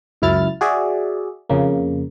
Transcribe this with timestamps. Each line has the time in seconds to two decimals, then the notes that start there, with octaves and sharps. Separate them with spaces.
0.22 C#2 F#2 E4 F6 A6
0.61 F#4 G#4 D5 E5
1.50 F2 C#3 A#3